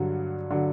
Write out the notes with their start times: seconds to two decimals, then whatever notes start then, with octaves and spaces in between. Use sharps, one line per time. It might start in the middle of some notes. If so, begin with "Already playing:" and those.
Already playing: G2 D3 F#3
0.50 D3 F#3